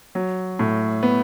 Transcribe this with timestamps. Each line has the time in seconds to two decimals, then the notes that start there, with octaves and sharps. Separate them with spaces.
0.15 F#3
0.59 A2
1.03 B3